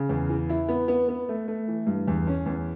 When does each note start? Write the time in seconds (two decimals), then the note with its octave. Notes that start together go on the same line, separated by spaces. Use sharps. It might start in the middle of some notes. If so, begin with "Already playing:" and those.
Already playing: C#3
0.09 E2
0.29 E3
0.49 E4
0.68 B3
0.88 B3
1.08 B3
1.29 A3
1.48 A3
1.68 E3
1.87 G2
2.08 E2
2.27 C#4
2.46 E2